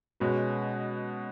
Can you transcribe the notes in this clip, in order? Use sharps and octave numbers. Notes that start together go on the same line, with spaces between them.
B2 G#3 C#4 F#4 B4